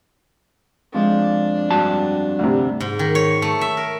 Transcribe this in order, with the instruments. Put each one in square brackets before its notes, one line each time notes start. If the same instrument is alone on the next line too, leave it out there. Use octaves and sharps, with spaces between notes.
[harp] F2 F3 G#3 [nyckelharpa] D4
[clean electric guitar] G2 F#4 A5
[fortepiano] D2 C3
[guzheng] G#2
D#3
C#5
A3
E5
A#4